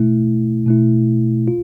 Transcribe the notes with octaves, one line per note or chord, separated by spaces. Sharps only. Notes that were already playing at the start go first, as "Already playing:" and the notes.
Already playing: B2 A3 E4
B2 A3 E4
F4